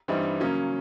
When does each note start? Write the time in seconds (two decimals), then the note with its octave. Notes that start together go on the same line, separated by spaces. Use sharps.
0.08 G2 E3 G3 C4 D#4
0.40 C#3 F#3 A#3 C#4